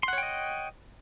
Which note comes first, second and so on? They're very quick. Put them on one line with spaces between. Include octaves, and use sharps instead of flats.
C6 F#5 C#5 G5 D#5